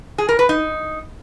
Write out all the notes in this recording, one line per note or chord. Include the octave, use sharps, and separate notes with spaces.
G#4
A#4
B4
D#4